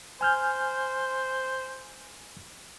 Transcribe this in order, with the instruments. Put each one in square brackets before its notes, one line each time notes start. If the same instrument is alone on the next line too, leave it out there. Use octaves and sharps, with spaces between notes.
[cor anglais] C5 [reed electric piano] G#5 F6 G6